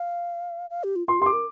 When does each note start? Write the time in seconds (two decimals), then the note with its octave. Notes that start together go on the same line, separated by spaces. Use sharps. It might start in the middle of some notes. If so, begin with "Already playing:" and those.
Already playing: F5
0.70 F5
0.84 G4
0.96 F4
1.08 F4 C6
1.20 G4 C6
1.26 D6
1.33 A#4